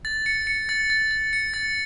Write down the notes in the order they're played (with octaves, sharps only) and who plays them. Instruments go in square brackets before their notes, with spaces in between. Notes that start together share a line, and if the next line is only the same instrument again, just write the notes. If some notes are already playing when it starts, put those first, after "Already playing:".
[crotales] A6
C#7
C#7
A6
A6
A6
C#7
A6